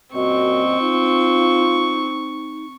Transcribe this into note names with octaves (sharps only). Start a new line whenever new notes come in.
F#2 A#2 C4 F#4 D#5 C#6
D#4 F4